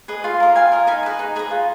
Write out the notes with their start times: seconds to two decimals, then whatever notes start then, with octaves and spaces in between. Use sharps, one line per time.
0.08 G#4 B4 D#5
0.24 F4 F5
0.40 A#4 D#5
0.56 F4 F5 G#5
0.72 A#4 D#5
0.87 D#4 G#5 B5
1.03 G#4 B4 D#5
1.19 D#4
1.36 G#4 B4 D#5
1.51 F4